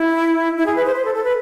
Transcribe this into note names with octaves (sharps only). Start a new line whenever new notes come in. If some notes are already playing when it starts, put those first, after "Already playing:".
Already playing: E4
E4
G#4
B4
C5
C5
A4
A4
B4